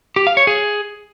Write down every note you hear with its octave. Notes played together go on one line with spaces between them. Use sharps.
G4
F5
C#5
G#4